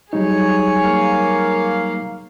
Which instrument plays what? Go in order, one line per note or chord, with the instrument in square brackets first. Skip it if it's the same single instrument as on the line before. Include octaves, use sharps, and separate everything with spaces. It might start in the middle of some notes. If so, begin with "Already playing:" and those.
[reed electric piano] F#3 G3 D#4 [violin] G#4 C#5
[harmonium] A#3 F5